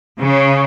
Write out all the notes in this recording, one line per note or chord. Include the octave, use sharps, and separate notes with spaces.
C#3